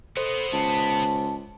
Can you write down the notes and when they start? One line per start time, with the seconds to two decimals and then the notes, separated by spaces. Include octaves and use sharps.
0.17 B3 A4 C5 D#5
0.52 C#2 A5